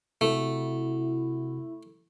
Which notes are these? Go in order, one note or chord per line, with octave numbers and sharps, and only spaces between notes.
C3 A3 E4 F#4 F#5